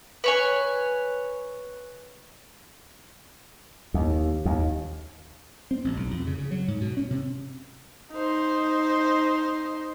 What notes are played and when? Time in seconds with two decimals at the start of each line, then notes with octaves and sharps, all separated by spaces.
0.24 B4 C#5 G#5
3.94 D#2
4.45 D#2
5.71 C4
5.85 A1
5.97 B1
6.11 F2
6.27 C#3
6.38 C#3
6.51 F#3
6.68 G#2
6.81 B2
6.97 C#4
7.11 C3
8.12 D#4 C5